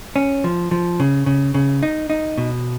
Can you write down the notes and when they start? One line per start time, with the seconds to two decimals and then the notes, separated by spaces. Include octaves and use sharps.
0.16 C#4
0.44 F3
0.71 F3
1.00 C#3
1.26 C#3
1.54 C#3
1.83 D#4
2.10 D#4
2.38 B2